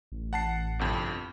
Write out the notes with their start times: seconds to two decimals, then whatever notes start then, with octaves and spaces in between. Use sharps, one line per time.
0.12 A1
0.33 F#5 A5 C7
0.79 G1 C2 F2